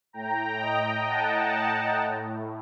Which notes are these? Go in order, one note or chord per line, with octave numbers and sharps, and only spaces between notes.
A2 G5 A#5
D#5 G5
F#5 A5
A2